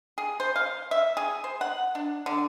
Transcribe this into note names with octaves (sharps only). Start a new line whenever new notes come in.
G#4
C5
F5
E5
G#4
C5
F#5
D4
D3